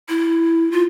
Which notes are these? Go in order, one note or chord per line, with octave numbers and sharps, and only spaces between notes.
E4
F4